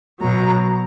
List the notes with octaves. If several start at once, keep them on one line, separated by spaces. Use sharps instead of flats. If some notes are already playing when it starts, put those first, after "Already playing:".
B2 F#3 A#5